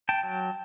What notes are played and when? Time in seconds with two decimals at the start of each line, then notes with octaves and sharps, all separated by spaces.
0.09 G5 A5
0.23 F#3